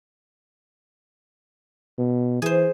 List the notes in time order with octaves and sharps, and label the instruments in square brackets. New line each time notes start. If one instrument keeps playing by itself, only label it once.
[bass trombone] B2
[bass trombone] E3 [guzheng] G#4 C5